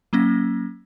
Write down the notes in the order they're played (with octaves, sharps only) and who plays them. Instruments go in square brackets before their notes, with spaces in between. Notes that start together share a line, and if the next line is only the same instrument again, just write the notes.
[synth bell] F#3 A#3 C#4 A#6